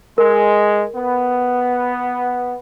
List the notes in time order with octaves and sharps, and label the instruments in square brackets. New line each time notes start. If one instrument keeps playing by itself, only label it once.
[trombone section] G#3 [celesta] A#4
[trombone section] B3